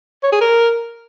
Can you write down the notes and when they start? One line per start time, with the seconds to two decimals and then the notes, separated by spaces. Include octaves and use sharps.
0.23 C#5
0.32 G#4
0.41 A#4